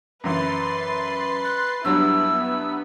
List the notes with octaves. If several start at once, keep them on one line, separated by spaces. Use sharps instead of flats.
F#2 E3 B4 C6 A6 C7
F#6
G2 F#3 G3 B3 E4 E6